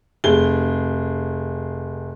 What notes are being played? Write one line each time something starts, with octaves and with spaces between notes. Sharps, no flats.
F1 G#4 G7